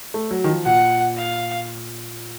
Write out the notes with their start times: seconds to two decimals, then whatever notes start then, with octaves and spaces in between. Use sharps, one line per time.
0.14 A3
0.31 F#3
0.44 D#3
0.48 F3
0.66 A#2 F#5
1.17 F5